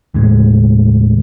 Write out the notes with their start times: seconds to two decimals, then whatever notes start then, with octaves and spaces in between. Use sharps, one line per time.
0.14 D#2 A2 C#3 G#3